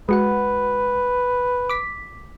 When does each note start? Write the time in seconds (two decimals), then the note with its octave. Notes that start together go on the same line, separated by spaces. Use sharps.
0.09 G#3 F#4 B4 F#5
1.70 D6 B6